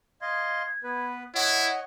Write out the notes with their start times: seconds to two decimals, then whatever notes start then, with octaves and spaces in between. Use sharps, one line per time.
0.22 D#5 F5 C6 G#6
0.84 B3 B4
1.35 E4 C#5 D#5 F#5